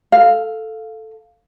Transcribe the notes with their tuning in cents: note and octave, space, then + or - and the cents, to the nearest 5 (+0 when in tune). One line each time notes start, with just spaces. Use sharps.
A4 +0 F5 +0